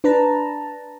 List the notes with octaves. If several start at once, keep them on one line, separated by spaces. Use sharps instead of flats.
D4 B4 A5 A#5